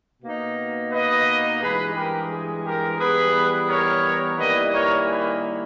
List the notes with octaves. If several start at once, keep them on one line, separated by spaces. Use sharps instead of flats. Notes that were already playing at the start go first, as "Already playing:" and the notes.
B2 A#3 D#4
B4 D#5
G2 E3 G#3 G#4 B4
G4 A#4
G#4
G4 A#4
E3 G3 B3 G#4 B4
A#4 C#5
D#3 G3 A#3 E4 B4 D#5
A#4 C#5
G#4 B4